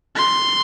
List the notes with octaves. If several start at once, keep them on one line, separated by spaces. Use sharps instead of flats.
C6